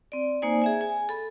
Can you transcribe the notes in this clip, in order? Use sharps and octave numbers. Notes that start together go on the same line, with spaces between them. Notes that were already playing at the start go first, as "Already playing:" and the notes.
C4 D5
A#3 D#4 C5 D5 G#5
G#4 E5 G#5
G#5
A4 B5